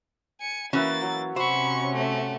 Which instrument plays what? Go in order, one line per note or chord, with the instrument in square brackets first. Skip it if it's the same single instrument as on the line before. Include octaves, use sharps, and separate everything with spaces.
[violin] G#5 C#7
[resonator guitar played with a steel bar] E3 C#4 F#4 [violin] A#3 A6 [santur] B4 C#5 E5
[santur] F#3
[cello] C3 C#4 [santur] F#4 [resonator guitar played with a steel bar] C5 [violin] B5 C#6
[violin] A3